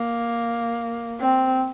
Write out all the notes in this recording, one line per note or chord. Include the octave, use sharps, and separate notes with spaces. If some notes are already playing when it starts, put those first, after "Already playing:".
Already playing: A#3
C4